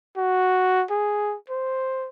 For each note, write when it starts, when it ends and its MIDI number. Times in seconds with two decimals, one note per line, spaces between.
0.17 0.84 66
0.91 1.36 68
1.49 2.09 72